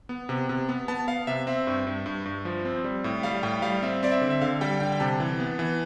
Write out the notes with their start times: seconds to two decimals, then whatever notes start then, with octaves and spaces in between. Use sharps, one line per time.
0.09 B3
0.29 C3
0.49 C3
0.69 B3
0.88 B3 A5
1.07 B3 F5
1.27 C3 E5
1.47 C4 E5
1.67 G2
1.87 G2
2.06 G2
2.25 G2
2.45 F3
2.65 C4
2.84 G3
3.04 A2
3.23 G3 F5
3.43 A2 G5
3.62 G3 F5
3.82 C4 E5
4.03 C4 D5
4.11 E5
4.21 D3
4.30 E5
4.41 D3 F5
4.61 G3 G5
4.80 D3 G5
4.92 G5
5.00 C3 A5
5.20 E3
5.40 B3
5.59 E3